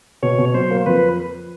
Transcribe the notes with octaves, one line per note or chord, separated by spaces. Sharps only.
B2 C#5
B2
F#3 C5
A#3
F2 B4